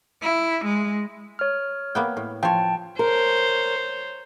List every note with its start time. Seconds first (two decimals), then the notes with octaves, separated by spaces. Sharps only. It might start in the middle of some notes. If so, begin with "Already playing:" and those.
0.22 E4
0.64 G#3
1.39 C#5 F6
1.95 A#3 B3 G5
2.17 A2
2.43 F3 C#5 G5 A5
2.99 A#4 C5 C#5